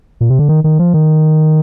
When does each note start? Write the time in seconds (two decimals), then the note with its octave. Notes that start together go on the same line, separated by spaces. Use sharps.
0.21 A#2
0.30 C3
0.39 D3
0.49 D#3
0.64 D#3
0.79 F3
0.94 D#3